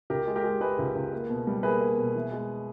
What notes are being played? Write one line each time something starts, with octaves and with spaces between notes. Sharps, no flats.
C#2 G4 A#4
G#3
G4 A#4
G#3
G#3 G#4 B4
C#2
C#2
A#3
B2
G3
A#3 G#4 B4
A#3
B2
E3
G#3